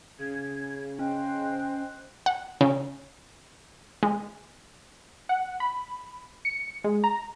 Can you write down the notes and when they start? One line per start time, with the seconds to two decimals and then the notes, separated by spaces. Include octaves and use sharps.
0.18 C#3 G#6
0.99 C#4 C5 D#5 G5 F#6
2.26 F#5
2.61 C#3
4.03 G#3
5.29 F#5
5.60 B5
6.45 C#7
6.84 G#3
7.04 A#5